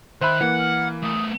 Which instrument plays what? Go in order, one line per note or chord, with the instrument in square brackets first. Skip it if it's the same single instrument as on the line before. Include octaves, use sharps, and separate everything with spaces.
[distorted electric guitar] D#3 D#4 [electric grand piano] C5 E5 B5 [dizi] F#6
[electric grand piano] E3 A#3 [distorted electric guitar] F#5
[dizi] F6
[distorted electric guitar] A3 B3 [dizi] D#6